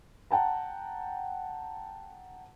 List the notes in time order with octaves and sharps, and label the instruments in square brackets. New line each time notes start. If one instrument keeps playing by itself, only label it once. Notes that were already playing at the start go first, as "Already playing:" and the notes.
[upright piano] F#5 G5 A5 A#5